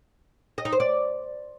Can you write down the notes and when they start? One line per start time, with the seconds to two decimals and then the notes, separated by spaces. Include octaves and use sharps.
0.58 D#5
0.65 D#4
0.72 C5
0.80 D5